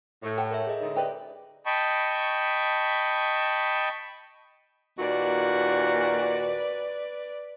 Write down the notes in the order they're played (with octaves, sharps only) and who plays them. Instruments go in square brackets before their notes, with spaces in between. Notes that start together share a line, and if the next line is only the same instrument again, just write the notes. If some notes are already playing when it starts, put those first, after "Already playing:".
[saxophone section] A2
[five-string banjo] G4 F#5 A5
[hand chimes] A#4 C#5 E5
G#4 D#5 E5
[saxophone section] D3 G#3 D#4
[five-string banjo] G4 B4 D5
[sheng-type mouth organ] D#5 G5 A5 B5 C#6
[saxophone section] D#2 A#2 F#4 [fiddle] B4 D5